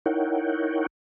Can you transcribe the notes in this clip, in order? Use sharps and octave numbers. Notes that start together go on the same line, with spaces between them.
D#4 E4 A#4 C#5 F#5 G5